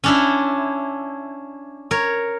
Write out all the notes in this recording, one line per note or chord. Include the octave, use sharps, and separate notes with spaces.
C#4 D4 E4
A#4 C#5